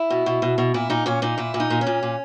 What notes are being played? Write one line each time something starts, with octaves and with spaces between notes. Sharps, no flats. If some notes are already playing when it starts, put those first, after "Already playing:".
Already playing: E4
B2
B2
B2
B2
A#2 E4
A#2 D#4
A#2 C#4
A#2 D#4
A#2 E4
A#2
D#4
A#2
C#4
A#2
A#2